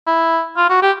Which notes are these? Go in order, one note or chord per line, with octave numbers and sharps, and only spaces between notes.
E4
F4
F#4
G4